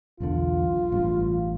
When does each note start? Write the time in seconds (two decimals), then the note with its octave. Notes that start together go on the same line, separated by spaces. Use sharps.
0.20 B1 E2 D3 F4
0.92 A1 G2 G3